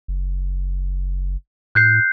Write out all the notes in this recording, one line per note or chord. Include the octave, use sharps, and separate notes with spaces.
F#1
A2 F#6 G6 C7